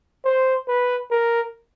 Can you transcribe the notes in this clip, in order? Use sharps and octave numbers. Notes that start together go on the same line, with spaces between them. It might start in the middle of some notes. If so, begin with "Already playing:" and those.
C5
B4
A#4